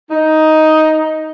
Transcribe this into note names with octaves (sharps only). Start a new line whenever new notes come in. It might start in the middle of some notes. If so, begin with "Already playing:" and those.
D#4